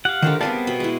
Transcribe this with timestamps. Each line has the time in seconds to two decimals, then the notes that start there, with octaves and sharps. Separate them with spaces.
0.05 G4 F5 F#5
0.23 D3 D#3 G4 A#4 C5
0.41 G3 B3 C4 G#4 D5 F5 A5
0.67 B2 B5
0.80 G#3 E4